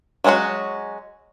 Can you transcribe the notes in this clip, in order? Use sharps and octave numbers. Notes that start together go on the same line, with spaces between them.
F#3 G#3 B3 C#4 F#4